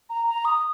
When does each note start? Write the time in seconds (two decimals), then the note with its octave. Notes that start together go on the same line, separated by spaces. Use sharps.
0.09 A#5
0.27 A#5
0.45 D#6